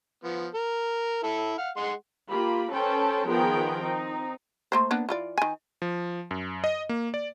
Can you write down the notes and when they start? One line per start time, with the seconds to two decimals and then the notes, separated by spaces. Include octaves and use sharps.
0.24 F3 B3
0.55 A#4
1.23 E4 A4
1.58 F5 F#5
1.77 G#3 F#5 C6
2.29 A#3 F4 G4 B5
2.73 C#4 A4 B4 C5 G5 A5
3.29 D#3 F3 B3 G#4 A#4 G5
3.83 C4 D#4
4.72 A3 A#3 C5
4.91 A#3 B3 D4
5.09 E3 F4 D5
5.38 D#3 G#5
5.82 F3
6.31 F#2
6.64 D#5
6.89 A#3
7.14 D5